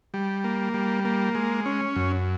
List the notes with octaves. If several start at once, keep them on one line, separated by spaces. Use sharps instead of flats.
G3
A#3
G3
A#3
G#3
C#4
F#2